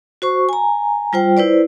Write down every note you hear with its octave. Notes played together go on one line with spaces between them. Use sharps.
F#4 C5 C#6
G#5 A#5
G3 F4 C5 G5
E4 B4 C5 D5